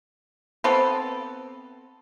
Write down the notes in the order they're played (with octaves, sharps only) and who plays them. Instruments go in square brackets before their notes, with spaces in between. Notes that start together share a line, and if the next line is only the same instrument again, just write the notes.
[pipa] B3 C4 A4